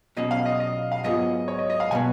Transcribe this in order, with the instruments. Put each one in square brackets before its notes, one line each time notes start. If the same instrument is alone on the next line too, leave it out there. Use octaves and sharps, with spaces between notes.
[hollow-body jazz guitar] B2 F#3 C#4 [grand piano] D#5
[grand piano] F5
D#5
D#5
F5
[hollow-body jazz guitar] G#2 F#3 B3 F4 G#4 [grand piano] D#5
[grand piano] C#5
D#5
D#5
F5
[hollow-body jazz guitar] B2 F#3 B3 [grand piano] G#5